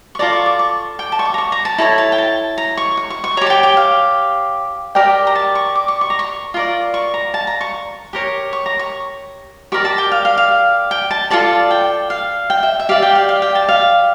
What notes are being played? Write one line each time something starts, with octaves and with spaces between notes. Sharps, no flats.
C#6
F4 A4 D5 A#5
C#6
D6
C#6
G5
A5
C#6
D6
A#5
C#6
A#5
A5
E4 A4 C#5 A#5
A5
G5
A5
A#5
C#6
C#6
C#6
C#6
G4 C#5 A#5
A5
G5
G5
F5
G4 A#4 D5 G5
A#5
A5
C#6
D6
C#6
C#6
A#5
C#6
F4 A#4 D5
C#6
A#5
A5
A#5
C#6
G4 A#4 C#5
C#6
A#5
C#6
G4 A#4 D5 C#6
A5
G5
F5
F5
F5
G5
A5
F4 A4 D5 A5
G5
F5
G5
E5
E5
G4 D5 F5
G5
F5
F5
G5
A5
F5